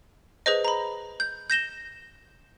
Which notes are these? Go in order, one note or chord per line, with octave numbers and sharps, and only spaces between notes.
G#4 B4 C5 D#5
A#5 B5
G6
G6 A#6 E7 G7